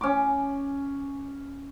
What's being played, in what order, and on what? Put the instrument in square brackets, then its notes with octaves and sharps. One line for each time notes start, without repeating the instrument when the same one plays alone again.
[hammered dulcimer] C#4 D6